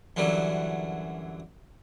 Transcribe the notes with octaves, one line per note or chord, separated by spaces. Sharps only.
F#2 D3 E3 F#3 G3